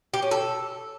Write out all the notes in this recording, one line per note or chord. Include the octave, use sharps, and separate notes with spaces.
G4
C#4
A4